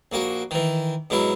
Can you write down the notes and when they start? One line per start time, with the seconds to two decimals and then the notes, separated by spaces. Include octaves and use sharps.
0.12 A#1 A#3 F#4
0.51 D#3 E3
1.10 G#2 B2 F#3 E4